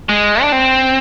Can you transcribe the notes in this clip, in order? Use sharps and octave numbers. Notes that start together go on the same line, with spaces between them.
G#3
D4
C4